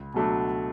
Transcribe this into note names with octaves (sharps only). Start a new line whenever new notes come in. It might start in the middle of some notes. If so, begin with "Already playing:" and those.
Already playing: C#2
B2 F#3 A3 D4